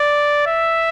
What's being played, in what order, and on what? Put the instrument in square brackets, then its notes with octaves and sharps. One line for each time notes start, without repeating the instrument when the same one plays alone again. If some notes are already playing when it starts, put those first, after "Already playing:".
Already playing: [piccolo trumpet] D5
E5